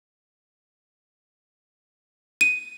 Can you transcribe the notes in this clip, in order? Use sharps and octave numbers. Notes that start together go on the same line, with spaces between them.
D#7